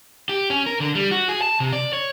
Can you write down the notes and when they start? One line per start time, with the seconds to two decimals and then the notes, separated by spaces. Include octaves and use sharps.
0.29 G4
0.50 C#4
0.66 A#4
0.80 D3
0.95 G3
1.11 F#4
1.28 G#4
1.42 A5
1.60 C3
1.72 D5
1.93 C#5